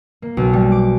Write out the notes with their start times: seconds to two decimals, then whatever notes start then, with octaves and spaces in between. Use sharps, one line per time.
0.22 A#3
0.37 B1
0.53 G3
0.72 D6